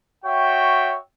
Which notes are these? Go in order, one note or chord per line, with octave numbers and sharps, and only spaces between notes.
F#4 C#5 E5 G5